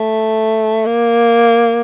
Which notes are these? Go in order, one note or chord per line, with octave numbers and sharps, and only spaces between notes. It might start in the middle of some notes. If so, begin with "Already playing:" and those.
Already playing: A3
A#3